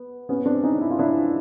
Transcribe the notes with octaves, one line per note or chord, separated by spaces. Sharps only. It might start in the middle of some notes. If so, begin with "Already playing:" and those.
Already playing: B3
B3 C#4
C4 D4
C#4 D#4
E4
F4
D4 E4